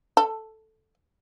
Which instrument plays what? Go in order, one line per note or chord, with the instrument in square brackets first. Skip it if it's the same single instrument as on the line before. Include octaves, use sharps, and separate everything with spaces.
[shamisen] A4